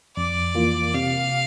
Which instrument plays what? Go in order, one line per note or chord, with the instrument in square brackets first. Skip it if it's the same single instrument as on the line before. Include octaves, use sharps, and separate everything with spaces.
[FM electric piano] F2 [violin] D5
[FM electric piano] E3 A#3 F4
[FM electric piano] C3 [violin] F5